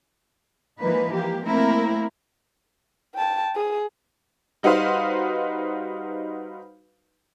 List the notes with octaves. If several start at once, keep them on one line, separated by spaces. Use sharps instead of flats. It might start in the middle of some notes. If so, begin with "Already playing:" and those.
E3 F3 G#3 A#3 D#4 B4
A#3 G4
A3 A#3 C4 E4 A#4
G5 A5
G#4
G3 D#4 F#4 B4 C5 F5